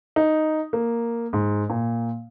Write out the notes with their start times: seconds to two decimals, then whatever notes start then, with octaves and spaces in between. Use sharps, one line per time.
0.16 D#4
0.73 A#3
1.33 G#2
1.70 A#2